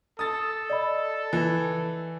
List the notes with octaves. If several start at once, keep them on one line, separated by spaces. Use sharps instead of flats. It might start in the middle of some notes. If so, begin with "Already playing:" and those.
A4 D#6 A6
D5 D#5 B5
E3